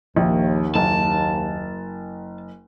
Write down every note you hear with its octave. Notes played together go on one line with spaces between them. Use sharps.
A#1 D#2
F#1 A5